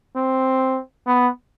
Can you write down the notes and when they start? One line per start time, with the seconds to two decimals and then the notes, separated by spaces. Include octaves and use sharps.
0.16 C4
1.07 B3